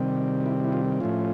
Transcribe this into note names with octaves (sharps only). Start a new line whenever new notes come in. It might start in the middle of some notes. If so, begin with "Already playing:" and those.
Already playing: C3 D#3 G3 C4
E4
E4
F4
A2 F3 A3 C#4 F4